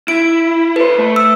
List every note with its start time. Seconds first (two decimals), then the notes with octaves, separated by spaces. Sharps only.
0.08 E4 D7
0.76 A4 B4 C5
0.98 A3
1.16 E6